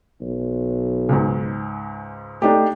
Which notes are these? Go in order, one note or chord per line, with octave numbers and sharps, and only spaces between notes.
B1
C#2 G#2
A3 D4 D#4 G4